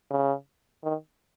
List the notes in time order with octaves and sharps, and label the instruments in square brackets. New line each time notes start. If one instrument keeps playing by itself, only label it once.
[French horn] C#3
D#3